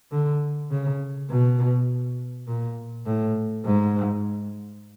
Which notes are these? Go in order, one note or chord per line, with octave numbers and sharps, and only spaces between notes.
D3
C#3
B2
A#2
A2
G#2